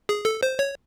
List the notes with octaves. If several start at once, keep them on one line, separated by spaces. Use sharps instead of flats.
G#4
A4
C5
C#5